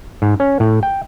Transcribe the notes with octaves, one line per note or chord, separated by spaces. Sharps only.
G#2
C#4
A2
G5